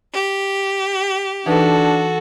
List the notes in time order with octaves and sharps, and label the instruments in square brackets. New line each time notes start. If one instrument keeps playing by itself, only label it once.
[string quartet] G4
[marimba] E3 D#4 B4 [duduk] D4 [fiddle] F#4 A4